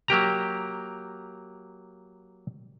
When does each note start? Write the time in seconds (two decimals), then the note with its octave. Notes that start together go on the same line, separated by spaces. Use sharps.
0.08 F#3 A#3 G4 A#5